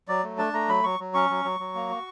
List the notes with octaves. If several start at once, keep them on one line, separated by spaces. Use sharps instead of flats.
F#3 D5
A3
D4 A5
A3 A#5
F#3 B5
F#3 C#6
F#3
C#4 C#6
F#3
F#3
F#3
A#3
F#4